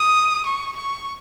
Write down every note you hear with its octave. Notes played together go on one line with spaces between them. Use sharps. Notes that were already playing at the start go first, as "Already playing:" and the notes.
Already playing: D#6
C#6
C#6